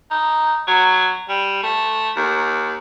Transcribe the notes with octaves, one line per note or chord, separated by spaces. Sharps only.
D#4
F#3
G3
A3
D#2